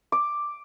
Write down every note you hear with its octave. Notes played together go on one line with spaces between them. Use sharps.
D6